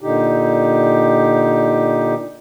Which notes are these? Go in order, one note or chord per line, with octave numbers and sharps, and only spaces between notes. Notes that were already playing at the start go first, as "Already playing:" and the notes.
A#2 D3 D#4 G4